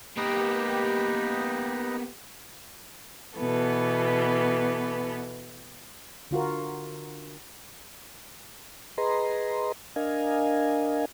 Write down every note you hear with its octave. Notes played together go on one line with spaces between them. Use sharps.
A#3 B3 D#4 G4 B4 D#5
B2 E3 B3 A4
D3 F4 F#4 A#4
G#4 B4 D#5 A#5 C6
D4 A#4 D#5 F5 G#5